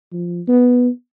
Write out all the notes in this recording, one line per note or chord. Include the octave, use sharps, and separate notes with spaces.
F3
B3